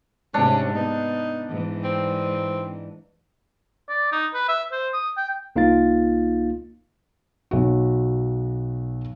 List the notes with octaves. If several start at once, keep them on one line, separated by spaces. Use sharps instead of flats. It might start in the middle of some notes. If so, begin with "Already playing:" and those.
G#2 C3 C#4 D4
B3 D#4
G#2 E3
C4
D5
D#4
B4
E5
C5
D#6
G5
C2 A#3 D#4 F4 F5 A6
B1 F#4